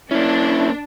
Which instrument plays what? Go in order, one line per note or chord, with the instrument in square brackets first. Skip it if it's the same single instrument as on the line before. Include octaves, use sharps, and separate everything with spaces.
[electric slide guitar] A#3 C#4 [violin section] D4 [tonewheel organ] E4